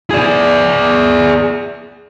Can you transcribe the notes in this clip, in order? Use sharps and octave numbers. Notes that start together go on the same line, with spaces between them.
G#4 D5